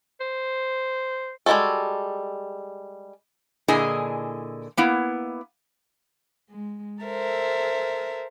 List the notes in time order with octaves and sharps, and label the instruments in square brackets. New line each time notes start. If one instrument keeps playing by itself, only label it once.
[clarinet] C5
[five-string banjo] G3 G#3 E4 F#4 A4
[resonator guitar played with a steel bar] A#2 D3 E4 G#4 D#5 G#5
A#3 B3 E4
[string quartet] G#3
A4 A#4 C5 E5